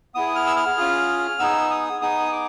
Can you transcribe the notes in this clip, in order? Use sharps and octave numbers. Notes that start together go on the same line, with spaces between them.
B3 E4 G#4 D#6
F6
E6
F6
C#4 F4 G#4
B3 D#4 G#4 E6
D#6
B3 D#4 G#4 D#6
D6